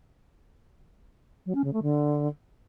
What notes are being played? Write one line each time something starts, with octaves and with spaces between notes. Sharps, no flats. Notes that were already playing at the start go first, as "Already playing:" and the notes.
F#3
C#4
C#3
A3
D3